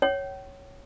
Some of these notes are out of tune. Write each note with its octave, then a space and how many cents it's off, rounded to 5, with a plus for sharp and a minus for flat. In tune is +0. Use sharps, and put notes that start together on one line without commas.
C#5 +0 G5 -45